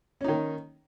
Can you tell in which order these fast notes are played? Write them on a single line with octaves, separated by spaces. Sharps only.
C#4 D#4 D#3